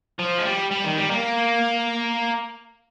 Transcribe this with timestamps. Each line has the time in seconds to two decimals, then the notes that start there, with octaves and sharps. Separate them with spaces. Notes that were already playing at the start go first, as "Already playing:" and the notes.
0.19 F3
0.38 G#3
0.45 G3
0.71 G3
0.84 D#3
0.98 G3
1.11 A#3